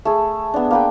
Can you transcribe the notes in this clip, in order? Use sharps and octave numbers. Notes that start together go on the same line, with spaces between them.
A3 G#4
B3 D4
A#3 B4 G5